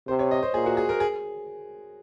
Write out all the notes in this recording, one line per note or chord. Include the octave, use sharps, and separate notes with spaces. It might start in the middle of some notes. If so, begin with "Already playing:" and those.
C3 C5
C#5
D#5
C5
A#2 G#4
F#4
G#4
A#4
G#4